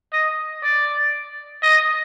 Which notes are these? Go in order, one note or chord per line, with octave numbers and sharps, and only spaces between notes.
D#5
D5
D#5